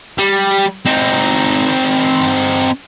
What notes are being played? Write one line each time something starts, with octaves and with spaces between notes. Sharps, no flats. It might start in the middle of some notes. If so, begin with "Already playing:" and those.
G3
C4 D#4